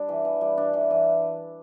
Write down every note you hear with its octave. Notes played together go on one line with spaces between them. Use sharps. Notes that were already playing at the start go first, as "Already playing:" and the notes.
Already playing: G3 D4
E3
E3
G3
D4
E3
E3